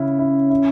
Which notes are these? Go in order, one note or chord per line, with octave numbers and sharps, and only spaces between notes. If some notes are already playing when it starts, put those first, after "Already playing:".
Already playing: C#3 C#4 E4
E4
E4